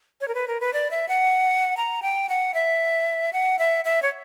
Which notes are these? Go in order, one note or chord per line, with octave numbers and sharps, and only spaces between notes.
C#5
A#4
B4
A#4
B4
D5
E5
F#5
A#5
G5
F#5
E5
F#5
E5
E5
C#5